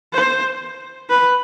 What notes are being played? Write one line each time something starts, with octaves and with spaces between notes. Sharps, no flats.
C5
B4